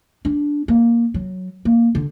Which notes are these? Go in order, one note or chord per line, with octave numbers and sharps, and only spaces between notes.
D4
A#3
F#3
A#3
D3